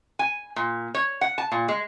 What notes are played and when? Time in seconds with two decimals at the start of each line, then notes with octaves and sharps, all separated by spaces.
0.19 G#5
0.56 A#2
0.95 C#5
1.21 F#5
1.38 A5
1.52 A#2
1.68 G#3